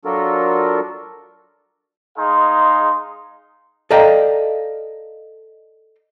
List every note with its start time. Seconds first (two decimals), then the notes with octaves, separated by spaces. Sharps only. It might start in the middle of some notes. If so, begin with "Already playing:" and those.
0.05 F#3 D4 F4 F#4 A4 A#4
2.18 G#3 D#4 G#4 F5 C6
3.91 A4 D5 D#5 F5 G5 A#5